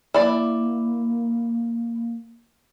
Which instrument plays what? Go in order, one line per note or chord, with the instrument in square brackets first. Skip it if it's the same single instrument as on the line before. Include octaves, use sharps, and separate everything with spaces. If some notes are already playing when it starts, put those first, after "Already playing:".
[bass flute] A#3 [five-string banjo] E4 D5